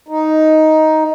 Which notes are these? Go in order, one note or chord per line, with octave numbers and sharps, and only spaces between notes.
D#4